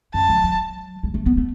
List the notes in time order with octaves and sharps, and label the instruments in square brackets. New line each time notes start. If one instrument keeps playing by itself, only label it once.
[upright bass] F#2 [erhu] A5
[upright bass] F3
F#3
G#3
A3
B3
A3